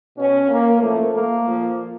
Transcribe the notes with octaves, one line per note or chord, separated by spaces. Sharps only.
B2 C#4
A#3
A2 F3 A3
A#3
A#2 F3